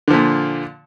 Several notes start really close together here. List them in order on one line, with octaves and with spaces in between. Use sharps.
D3 F3 A#2